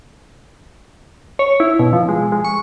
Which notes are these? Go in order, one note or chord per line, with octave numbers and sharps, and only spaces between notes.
C#5
E4
B2
F3
G#3
G#3
C#6